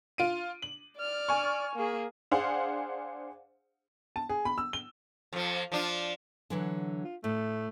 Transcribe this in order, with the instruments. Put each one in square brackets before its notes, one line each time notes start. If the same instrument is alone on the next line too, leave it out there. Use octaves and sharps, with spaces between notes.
[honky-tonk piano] F4 D7 D#7
F#7
[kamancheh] D5 F6
[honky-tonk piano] G#5 C#6
[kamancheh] A#3 G#4
[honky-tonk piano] D4 G#4 C5 F5 F#5
[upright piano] A5
G#4
B5
E6
G7
[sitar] F2 F3
F3 D4 F4
[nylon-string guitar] D3 E3 F#3
[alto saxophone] F4
[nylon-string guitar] A2 [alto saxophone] A3